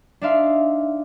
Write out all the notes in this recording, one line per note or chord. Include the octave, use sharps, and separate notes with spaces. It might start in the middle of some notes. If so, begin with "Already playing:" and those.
D4 D#4 D5 E5 F5 C6